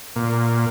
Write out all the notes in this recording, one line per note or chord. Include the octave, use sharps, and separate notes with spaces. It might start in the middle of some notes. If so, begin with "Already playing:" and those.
A#2